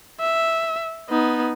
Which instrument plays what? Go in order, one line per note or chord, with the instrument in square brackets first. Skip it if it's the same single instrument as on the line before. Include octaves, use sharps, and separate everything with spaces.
[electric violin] E5
B3 D#4